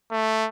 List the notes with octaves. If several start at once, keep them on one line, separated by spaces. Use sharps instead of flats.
A3